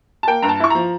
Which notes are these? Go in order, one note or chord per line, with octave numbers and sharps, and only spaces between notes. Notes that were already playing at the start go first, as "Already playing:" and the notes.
A5
A#3 G5
G2 A#5
A5
E4 C#6
F3 A#5